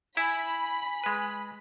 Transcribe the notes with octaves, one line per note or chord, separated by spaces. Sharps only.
E4 G#5 B5
G#3 B4